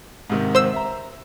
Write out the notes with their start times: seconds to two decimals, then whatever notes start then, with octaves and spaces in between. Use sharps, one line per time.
0.30 G#2 C3 D#3
0.55 C5 E6
0.73 E5 A#5